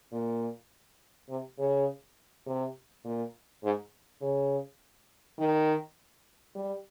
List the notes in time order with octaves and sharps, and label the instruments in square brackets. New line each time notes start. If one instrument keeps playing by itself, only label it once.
[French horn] A#2
C3
C#3
C3
A#2
G#2
C#3
D#3
G3